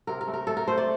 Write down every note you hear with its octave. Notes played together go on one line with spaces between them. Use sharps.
C3 A#4
A#4
A3
A#4
A3 A4
A#4
A3 C5
D5